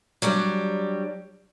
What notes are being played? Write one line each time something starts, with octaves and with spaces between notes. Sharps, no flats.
F#3 G3 D4 G4